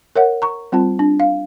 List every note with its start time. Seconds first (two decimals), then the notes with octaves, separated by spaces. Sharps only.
0.16 A#4 C#5 E5 F#5
0.42 A#5 C#6
0.72 G3 C4 F4 A5
0.99 D4
1.20 F5